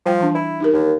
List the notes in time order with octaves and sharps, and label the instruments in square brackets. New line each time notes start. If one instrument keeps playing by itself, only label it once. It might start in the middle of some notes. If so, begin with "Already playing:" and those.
[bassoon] F3 [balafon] G3 G5
[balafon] E3 D4
[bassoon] E4
[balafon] D#4 G4 A#4
[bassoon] D#2